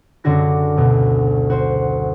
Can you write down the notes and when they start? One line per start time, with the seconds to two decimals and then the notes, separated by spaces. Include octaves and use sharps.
0.24 F#1 F#2 D3 D4 F#4 A#6
0.77 D2 B2
1.50 F#4 C5